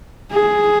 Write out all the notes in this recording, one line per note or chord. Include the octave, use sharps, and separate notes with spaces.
G#4